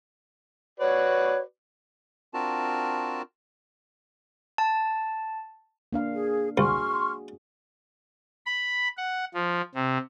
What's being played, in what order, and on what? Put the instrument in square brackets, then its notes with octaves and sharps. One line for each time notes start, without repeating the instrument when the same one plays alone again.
[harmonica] F#4 B4 D5 [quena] C#5
[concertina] C4 D4 F4 F#4 A#4 A5
[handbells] A5
[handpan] A#3 D4 F5
[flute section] G#4
[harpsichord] C2 [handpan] F#4 G#4 [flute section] C6 C#6 F6
[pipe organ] B5
F#5
F3
C3